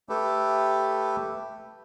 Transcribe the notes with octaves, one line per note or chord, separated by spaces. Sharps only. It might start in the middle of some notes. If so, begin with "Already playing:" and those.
A3 G4 A4 B4